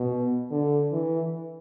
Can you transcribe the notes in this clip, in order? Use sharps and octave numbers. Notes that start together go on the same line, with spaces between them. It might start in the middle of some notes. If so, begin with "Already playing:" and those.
Already playing: B2
D3
E3